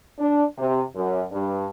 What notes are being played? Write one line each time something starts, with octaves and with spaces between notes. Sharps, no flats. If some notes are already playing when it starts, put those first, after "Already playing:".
D4
C3
F#2
G2